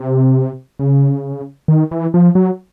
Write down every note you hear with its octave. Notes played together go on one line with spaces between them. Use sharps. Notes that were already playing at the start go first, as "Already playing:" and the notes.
Already playing: C3
C#3
D#3
E3
F3
F#3